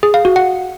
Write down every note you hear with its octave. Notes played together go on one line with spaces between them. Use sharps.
G#4
F5
F#4
F#5